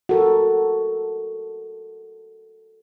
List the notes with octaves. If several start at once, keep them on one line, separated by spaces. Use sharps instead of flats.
F#4 A4 A#4